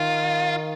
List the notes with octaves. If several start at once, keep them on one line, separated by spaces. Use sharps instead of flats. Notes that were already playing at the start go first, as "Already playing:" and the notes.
Already playing: D#3 F4